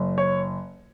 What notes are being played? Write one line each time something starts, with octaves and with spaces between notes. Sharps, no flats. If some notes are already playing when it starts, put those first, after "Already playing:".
Already playing: F#1
C#5